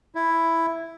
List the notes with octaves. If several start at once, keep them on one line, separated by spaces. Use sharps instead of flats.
E4